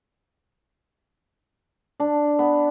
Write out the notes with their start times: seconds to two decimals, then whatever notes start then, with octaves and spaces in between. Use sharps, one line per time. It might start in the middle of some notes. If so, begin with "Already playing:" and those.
2.00 D4
2.39 B3